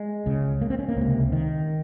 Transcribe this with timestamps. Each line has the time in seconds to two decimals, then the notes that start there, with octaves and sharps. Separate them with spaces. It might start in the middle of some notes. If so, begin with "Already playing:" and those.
Already playing: G#3
0.26 C#2 C#3
0.61 A#3
0.70 C4
0.79 C#4
0.89 A#3
0.96 C#2 C3
1.32 D#3